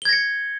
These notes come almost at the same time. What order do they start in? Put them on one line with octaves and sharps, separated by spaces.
G7 G#6 A#6 C#7